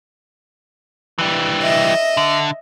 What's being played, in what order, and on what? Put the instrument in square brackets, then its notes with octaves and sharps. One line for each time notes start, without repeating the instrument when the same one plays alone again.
[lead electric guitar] E3 G3
[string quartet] D#5 E5
[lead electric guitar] D3